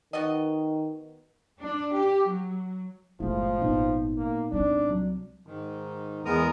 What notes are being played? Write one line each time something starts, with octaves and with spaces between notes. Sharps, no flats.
D#3 B3 F#4 D#5
D4
G4
F#3
G1 A#2 F3 G#3 A3 E4
G#1 A#2 B3 D#4
A#3
G3 C4 D4
C2 F#3
G#2 D#3
E2 G#3 B3 A#4 A#5 D#6